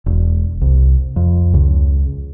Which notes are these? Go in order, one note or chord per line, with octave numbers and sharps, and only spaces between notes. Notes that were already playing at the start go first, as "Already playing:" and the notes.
E1
C2
F2
C#2